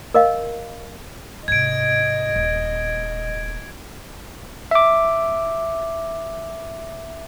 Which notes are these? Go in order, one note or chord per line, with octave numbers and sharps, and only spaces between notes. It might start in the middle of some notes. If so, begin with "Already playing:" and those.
A#4 D#5 F5
G#2 C3 D#5 G#6 D7
D#1
E5 D6